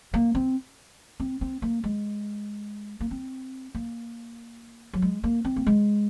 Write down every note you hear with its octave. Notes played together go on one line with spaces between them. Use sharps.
A#3
C4
C4
C4
A#3
G#3
A#3
C4
A#3
F#3
G#3
A#3
C4
A#3
G#3